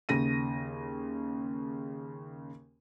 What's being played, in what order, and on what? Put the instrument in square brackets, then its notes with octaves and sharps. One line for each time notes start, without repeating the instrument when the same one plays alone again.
[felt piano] D#2 C#3 A#6 D#7